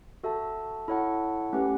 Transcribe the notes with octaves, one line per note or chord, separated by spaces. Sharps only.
F#4 A4 E5 A5
E4 A4 C#5 F#5 A5
A3 C#4 G4 B4 F#5